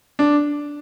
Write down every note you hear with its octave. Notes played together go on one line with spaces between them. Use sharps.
D4